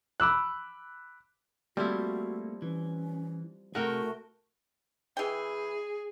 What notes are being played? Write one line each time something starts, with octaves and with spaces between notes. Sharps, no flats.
B5 D6 E6 F#6
F3 G3 A3 A#3 C4 E4 F#4
E3 C#4
C3 A3 E4 F#4 G#4 A#4 G5
E3 G#4 G5